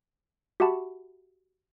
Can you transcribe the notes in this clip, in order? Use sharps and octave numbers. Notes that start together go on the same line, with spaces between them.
F#4 G4 E5 F#5 A5 B5